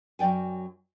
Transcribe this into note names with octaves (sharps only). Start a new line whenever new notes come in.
F#2 F#3 D5 G5 G#5